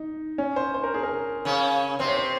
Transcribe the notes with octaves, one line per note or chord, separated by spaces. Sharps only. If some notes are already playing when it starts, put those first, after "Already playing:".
Already playing: D#4
C#4
C5
C5
A#4
G#4
A#4
C#3 C#4
C3 C4 C5
C#5
C5